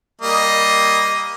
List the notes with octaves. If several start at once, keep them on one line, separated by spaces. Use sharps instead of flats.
G3 A#3 D#5